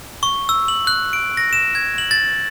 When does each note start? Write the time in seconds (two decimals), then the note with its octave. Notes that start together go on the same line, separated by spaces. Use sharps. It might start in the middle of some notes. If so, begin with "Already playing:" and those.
0.23 C#6
0.49 E6
0.68 F#7
0.87 F#6
1.13 D7
1.37 A#6
1.53 E7
1.75 G#6
1.98 F#7
2.11 A6